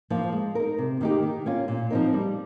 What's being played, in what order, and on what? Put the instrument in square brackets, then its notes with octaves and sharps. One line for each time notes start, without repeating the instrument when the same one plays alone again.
[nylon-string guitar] F3 A#3 F4
G#3
D#4 A#4
C3
D#3 A#3 D#4 G4
D#3
A#3 C#4 F4
A#2
F3 C4 D#4 A#4
G3